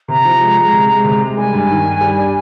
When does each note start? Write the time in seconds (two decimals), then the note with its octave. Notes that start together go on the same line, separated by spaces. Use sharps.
0.08 C3 A#5
0.25 F3
0.40 G#3
0.58 G#3
0.73 C3
0.89 G#3
1.05 C3
1.21 G#3
1.37 G3 G#5
1.53 G2
1.69 D#3
1.85 G2
2.01 G3
2.17 D4